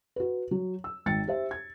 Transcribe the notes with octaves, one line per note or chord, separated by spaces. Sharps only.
F#4 B4
F#3
E6
G#1 G5 A6 C#7
G4 C5 E5
G#6